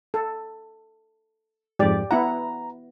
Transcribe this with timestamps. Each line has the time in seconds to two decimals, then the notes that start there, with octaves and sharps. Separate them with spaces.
0.14 A4
1.79 F2 G#2 G4 D5
2.11 B3 E4 F#5 A#5